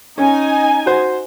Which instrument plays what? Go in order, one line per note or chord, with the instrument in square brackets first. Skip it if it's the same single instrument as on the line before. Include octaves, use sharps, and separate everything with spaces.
[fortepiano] C#4 [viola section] D#4 G#5
[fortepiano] F#4 C5